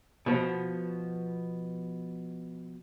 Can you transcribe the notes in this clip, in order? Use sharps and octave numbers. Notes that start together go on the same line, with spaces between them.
B2 F3 B3